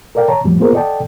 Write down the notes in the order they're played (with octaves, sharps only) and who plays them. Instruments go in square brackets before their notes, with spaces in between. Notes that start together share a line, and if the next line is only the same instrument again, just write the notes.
[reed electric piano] A4 A#4 D5 F5 G5
C#5 A5 A#5
F2 A2 F3 G3
A#3 B3 F4 G#4 A#4 C5
A4 D5 D#5 F#5 G5 A5